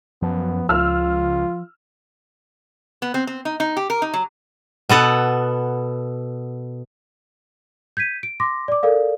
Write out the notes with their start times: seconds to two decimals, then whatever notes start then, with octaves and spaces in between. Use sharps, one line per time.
0.22 F#2 F3 B3
0.69 C#2 F4 E6 F6
3.02 B3
3.14 C4
3.27 C4
3.45 D#4
3.60 D#4
3.77 G4
3.90 A#4
4.02 D#4
4.14 F#3
4.89 B2 B3 A4 F#5
7.97 G6 G#6 B6 D#7
8.23 D7
8.40 C6 D6 A#6
8.68 D5 D6
8.83 A4 A#4 D5 F5